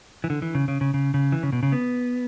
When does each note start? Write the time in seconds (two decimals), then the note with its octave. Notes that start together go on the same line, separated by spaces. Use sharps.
0.24 E3
0.30 D3
0.42 E3
0.55 C#3
0.68 C#3
0.81 C#3
0.94 C#3
1.14 C#3
1.32 E3
1.43 C#3
1.52 B2
1.63 C#3
1.72 B3